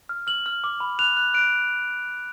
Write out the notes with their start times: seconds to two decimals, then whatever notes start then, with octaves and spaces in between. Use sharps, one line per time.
0.09 F6
0.27 F6 F#7
0.46 F6
0.64 D6
0.80 B5
0.99 F#6 F7
1.17 F#6
1.34 F#6 D7